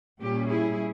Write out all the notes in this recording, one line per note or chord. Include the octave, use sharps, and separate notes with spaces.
A#2 G3 C#4 G4
E4 G#4